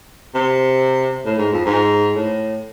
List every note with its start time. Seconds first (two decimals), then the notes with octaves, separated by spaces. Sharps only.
0.35 C3
1.26 A2
1.38 G#2
1.53 F2
1.66 G#2
2.17 A2